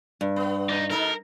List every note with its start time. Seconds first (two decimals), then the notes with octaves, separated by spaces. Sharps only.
0.21 G2
0.36 B3
0.69 D#4 D5
0.90 B2 D#4 A4 A#4